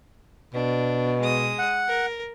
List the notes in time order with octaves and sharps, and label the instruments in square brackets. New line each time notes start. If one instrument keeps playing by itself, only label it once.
[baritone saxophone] B2 [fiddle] D4
[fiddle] G#3 D#6
[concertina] F#5
[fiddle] A#4